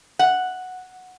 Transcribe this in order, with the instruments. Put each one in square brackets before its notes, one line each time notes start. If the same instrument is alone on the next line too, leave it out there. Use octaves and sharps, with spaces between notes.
[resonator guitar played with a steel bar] F#5